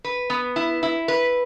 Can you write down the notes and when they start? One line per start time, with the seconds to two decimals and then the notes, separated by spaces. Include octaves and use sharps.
0.04 B4
0.30 B3
0.56 E4
0.83 E4
1.08 B4